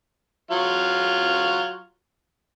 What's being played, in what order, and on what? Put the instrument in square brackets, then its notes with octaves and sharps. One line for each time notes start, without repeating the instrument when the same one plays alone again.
[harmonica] F#3 F4 F5